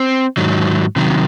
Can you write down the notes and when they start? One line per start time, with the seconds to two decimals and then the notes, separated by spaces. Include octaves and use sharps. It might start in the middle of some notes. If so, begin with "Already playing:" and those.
Already playing: C4
0.37 G#2 D#3 F#3
0.96 C3 D#3 F#3